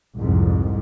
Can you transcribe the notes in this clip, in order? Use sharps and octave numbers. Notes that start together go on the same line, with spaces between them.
C2 F2 G#2